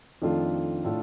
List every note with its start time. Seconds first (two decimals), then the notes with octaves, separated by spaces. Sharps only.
0.22 F2 D#3 A3 D4 F4
0.84 A2 A3 D4 F4 A4